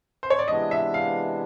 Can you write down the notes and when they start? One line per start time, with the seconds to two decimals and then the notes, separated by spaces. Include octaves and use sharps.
0.23 C5
0.30 C#5
0.39 D5
0.48 C3 E3 G#3 B3 D4 D#5
0.71 E5
0.94 F5